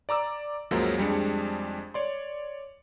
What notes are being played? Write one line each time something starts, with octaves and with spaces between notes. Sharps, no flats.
D5 A#5 D6 E6
C#2 F#2 F3 F#3 G#3 A#3
F2 G3 G#3 D4 C#7
C#5 D5 C6